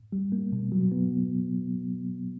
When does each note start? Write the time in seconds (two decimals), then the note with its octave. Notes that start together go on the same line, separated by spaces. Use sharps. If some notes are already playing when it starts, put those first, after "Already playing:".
0.12 G3
0.32 A#3
0.52 B2
0.72 F#3
0.92 B3